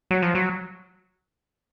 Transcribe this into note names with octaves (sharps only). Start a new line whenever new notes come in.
F#3
F3
F#3